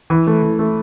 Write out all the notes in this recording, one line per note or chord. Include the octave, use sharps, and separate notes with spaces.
E3
A3
E3
A3